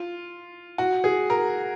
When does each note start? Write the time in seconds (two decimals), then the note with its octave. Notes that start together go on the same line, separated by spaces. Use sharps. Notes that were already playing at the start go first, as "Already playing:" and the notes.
Already playing: F4
0.78 F#4
1.04 G#4
1.30 A#4